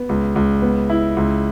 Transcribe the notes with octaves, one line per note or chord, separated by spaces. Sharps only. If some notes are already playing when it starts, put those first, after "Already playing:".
Already playing: B3
C#2
C#2
B3
E4
C#2